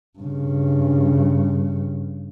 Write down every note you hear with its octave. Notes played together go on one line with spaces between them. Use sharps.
G2 C#3